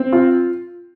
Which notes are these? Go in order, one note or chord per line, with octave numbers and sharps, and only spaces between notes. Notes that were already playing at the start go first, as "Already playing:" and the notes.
Already playing: C4
F4